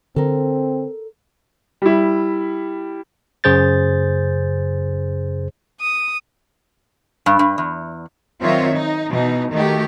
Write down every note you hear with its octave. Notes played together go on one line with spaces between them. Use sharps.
D3 C4 A4 A#4
G3 E4
F#2 C#3 G#4 C5 G6 A6
D#6
G2
G2
E2
D#3 F#3 C4 F4 C#5 E5
D#4
B2 E3 D#4
D#3 A3 D#4 F#4 G4